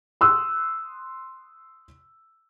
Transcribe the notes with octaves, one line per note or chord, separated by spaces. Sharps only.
C6 D#6 E6 F#6